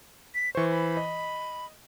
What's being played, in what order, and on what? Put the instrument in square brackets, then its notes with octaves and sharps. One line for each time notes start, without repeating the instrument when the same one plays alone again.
[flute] B6
[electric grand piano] E3 C5 [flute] C#6
[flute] B5
[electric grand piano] D#5